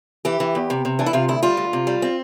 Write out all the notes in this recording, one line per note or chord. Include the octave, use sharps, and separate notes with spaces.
E3 G4
E3
E2
C3
C3
E3 D4
E4
C3 F4
D2 E4
G3 F4
D2
C3
G3
C4